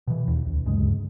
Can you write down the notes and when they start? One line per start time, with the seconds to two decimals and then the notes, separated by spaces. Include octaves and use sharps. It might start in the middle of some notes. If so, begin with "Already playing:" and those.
0.07 B2 E3
0.28 D#2
0.47 C#2
0.66 D2 G2 C#3 G#3